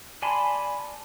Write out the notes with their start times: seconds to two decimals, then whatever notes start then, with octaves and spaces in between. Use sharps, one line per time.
0.22 D5 G#5 A5 B5 C6